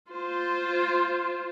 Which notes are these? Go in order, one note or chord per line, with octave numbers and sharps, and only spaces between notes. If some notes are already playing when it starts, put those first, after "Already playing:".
F4 C5